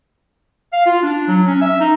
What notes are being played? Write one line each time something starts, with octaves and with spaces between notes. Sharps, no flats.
F5
F4
D4
F#3
C#4
E5
D#4